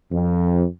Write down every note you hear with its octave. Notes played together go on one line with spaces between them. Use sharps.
F2